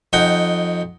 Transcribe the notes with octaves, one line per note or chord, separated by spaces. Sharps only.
F2 D#4 F#5 G5